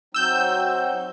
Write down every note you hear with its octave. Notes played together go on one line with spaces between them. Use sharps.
F#3 C4 D#4 E6 G6